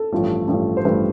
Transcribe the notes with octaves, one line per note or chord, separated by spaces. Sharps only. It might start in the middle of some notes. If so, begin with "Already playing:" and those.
Already playing: A4
A1 G2 F3 A3
A1 G2 F3 A3
C5
A1 G2 F3 A3 B4